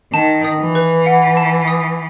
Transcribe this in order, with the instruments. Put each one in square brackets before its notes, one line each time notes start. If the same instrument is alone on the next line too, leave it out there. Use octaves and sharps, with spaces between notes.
[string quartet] D#3 [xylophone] A5
[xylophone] D#6
[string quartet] E3
[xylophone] B4
F#5
A5
D#6